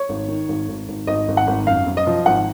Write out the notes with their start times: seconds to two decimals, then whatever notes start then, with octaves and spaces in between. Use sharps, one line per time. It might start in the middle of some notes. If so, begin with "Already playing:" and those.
Already playing: C#5
0.09 G#1
0.28 D#3
0.48 G#1
0.68 G#1
0.88 G#1
1.07 G#1 D#5
1.28 G#1
1.37 F#5
1.47 G#1
1.67 F#2 F5
1.87 F#2
1.97 D#5
2.07 F3
2.26 G#1 F#5